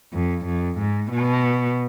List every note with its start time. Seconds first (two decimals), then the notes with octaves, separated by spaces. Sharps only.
0.13 F2
0.45 F2
0.78 G#2
1.12 B2